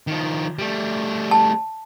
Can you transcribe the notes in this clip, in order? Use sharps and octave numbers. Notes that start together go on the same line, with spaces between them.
D#3 F3
G3 A3
A5